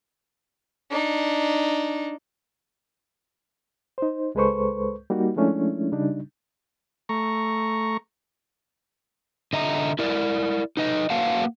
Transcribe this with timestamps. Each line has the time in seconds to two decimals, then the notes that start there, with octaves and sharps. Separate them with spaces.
0.90 D4 D#4
3.98 D#4 C5
4.35 C#2 G#3 A4 B4 C5 C#6
5.10 G3 A#3 D#4 F#4
5.36 F3 G#3 A3 C#4 D4 E4
5.92 C#3 G3 D4 D#4
7.09 A3 A#5 C#6
9.53 D3 D#5 E5 A#5
9.99 E4 A#4 D5
10.77 D#4 B4 D#5
11.10 A#3 F#4 B4 F5 F#5 A5